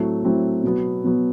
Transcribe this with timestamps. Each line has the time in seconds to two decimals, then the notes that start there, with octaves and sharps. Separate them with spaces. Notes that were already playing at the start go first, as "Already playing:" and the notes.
Already playing: A2 F#3 A3 C4 E4
0.23 A2 F#3 A3 C4 E4
0.63 B2 F#3 B3
1.04 B2 F#3 B3